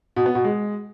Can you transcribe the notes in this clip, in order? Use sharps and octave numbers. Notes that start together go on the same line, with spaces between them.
B2
B3
B2
G#3